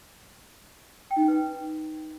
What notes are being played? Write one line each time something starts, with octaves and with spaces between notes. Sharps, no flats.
G5
D#4
C#4
B4